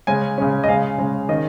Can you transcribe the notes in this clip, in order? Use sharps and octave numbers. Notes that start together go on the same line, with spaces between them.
C#3 G#3 C#4 G#5
C#3 G#3 C#4
D#5
C#3 G#3 C#4 F5
C#3 G#3 C#4
D#3 C#4 D#5